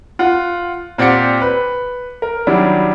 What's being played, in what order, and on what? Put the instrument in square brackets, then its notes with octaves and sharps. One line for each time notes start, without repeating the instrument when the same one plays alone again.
[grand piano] F4 F#5
A#2 C4 G4 D5 F#5 C#7
B4
A#4
D#3 F#3 G3 D4 E4